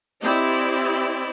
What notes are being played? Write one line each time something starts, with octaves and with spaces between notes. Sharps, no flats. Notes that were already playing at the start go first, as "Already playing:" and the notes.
C4 E4 G4 D5 D#5